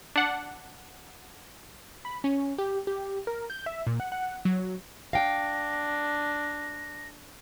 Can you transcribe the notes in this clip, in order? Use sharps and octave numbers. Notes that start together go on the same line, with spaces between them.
D4 F#5
B5
C#4
G4
G4
A#4
G6
E5
A#2
F#5
F#5
F#3
D4 F5 G5 A#6